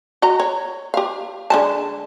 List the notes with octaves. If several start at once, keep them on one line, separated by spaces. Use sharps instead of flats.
F#4 D#5 A#5
C#5
G4 F5
D3 G#3 A5